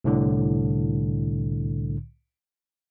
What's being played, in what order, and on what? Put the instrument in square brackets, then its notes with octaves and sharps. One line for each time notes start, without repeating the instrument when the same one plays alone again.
[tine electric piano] C2 A2 D3